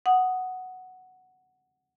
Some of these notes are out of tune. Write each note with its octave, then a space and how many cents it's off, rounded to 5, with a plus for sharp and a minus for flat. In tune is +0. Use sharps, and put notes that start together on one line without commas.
F#5 +0 D#6 +0